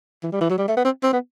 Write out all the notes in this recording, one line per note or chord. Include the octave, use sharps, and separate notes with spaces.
E3
G3
E3
F#3
G3
A3
B3
C4
C4
B3